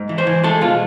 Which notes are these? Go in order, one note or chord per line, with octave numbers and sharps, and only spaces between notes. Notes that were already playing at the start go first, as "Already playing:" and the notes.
Already playing: G#2
E3
C5
E3
G#3 A4
B2 F4